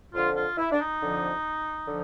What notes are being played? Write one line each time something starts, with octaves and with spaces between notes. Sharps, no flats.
F2 D3 F3 F4
F4
E4
D4
D#4
F2 D3 F3
D3 F3